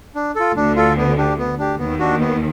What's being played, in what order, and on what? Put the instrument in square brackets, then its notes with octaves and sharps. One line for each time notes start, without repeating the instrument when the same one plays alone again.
[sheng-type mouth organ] D4
F4 A4
[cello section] D2 D3 [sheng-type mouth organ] D4
[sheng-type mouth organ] F4 A4
B3
D4 G4
B3
D4 G4
[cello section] D#2 D#3 [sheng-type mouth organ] B3
[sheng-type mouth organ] D4 F#4
B3